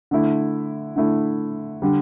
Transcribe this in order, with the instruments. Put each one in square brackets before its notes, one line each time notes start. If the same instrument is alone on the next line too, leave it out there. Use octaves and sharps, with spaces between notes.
[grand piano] D3 A3 E4
D3 A3 E4
D3 G3